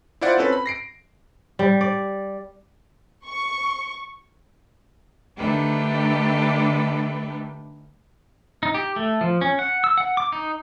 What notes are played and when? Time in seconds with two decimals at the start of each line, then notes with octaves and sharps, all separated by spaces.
0.21 E4 F4 C5 D5 F#5
0.37 C4 C#4 A4 B4
0.53 B5
0.66 A#6 C7 D7
1.59 G3
1.81 D5
3.26 C#6
5.37 D3 D#3 A3 D4 G4 B4
8.63 D#4
8.74 G4
8.96 A3
9.21 F3
9.41 C#4
9.59 F#5
9.84 E6
9.97 F#5
10.17 D6
10.32 D#4